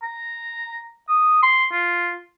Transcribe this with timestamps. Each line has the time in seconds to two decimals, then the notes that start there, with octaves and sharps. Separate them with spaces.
0.03 A#5
1.09 D#6
1.43 C6
1.72 F4